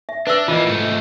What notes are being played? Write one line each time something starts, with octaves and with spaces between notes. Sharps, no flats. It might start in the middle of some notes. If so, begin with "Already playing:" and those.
E5
D4 B4 E5 E6
E3 A#3 F4 D#5
G#2 A3